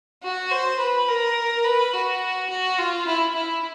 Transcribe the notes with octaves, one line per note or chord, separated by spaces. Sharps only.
F#4
C5
B4
A#4
B4
F#4
F#4
F4
E4
E4